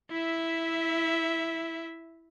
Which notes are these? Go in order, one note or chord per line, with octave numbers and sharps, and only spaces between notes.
E4 E5